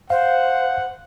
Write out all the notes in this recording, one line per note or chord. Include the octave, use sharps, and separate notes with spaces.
C5 F5 F#5